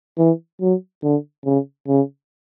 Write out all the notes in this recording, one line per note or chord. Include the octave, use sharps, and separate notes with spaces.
E3
F#3
D3
C#3
C#3